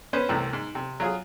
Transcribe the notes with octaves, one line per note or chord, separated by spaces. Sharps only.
B3 C#4 B4 C5
C2 A2 C3 E3
G#2
C3
F#3 F4 G#4